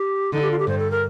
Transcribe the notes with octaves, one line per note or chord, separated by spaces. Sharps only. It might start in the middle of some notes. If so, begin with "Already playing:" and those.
Already playing: G4
D3 D#4
G4
F4
G4
G2 C5
A4
A#4